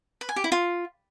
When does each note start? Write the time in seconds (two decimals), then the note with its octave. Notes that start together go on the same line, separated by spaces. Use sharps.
0.21 B4
0.29 G#5
0.36 G4
0.44 E4
0.52 F4